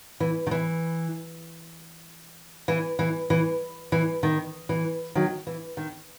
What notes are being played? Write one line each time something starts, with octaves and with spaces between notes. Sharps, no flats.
E3
D#3
E3
E3
E3
E3
E3
D#3
E3
D#3 F#3
E3
D#3